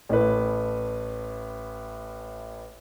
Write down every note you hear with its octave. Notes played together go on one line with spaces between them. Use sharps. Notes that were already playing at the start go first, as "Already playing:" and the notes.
A1 A2 A3 B4